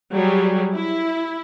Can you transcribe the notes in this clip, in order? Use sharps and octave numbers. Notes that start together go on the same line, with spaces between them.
F#3 G3 G#4
E4